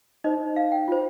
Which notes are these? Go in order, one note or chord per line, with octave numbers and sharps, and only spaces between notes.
D#4 C5 D#5
F5
G5
F4 C5